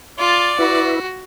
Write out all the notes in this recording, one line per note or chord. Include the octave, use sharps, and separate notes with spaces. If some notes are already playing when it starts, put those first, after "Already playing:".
F4 D5
E4 F#4 B4